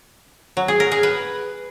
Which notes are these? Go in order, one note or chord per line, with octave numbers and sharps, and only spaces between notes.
F#3
G#4
A#4
G#4
B4